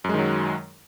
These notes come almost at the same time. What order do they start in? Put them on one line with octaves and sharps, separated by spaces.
F#2 G#3 D#3 F#3